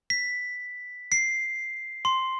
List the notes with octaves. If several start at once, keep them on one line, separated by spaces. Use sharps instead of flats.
B6
C7
C6